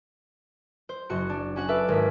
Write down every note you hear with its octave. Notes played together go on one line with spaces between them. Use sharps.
C5
F#1 F#4 C#7
D4
C#4 F#4 F#5
A4 B4 E5 F5 D6
G#1 B6